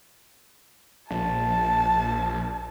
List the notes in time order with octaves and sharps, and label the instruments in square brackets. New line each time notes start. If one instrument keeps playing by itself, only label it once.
[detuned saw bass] A#1 [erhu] A5